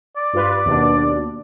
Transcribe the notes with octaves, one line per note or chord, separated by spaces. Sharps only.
D5
G2 F4 B4
D#2 B2 D4